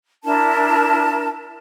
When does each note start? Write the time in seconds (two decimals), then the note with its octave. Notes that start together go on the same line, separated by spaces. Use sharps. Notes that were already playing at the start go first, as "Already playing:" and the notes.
0.24 D4 E4 A#4 A5